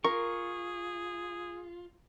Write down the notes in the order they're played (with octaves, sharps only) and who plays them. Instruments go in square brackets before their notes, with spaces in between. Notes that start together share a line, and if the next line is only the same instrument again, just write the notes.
[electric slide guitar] F4 [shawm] G#4 [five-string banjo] A#4 [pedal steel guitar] C#6